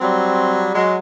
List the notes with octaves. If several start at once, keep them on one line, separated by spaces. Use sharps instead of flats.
F#3 G3 C4
F#3 G#3